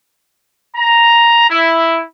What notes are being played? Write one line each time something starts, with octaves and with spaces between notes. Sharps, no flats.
A#5
E4